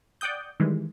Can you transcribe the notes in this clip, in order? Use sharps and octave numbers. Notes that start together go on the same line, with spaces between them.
D5 F#5 G5 D#6 G6
D#3 E3 G3 G#3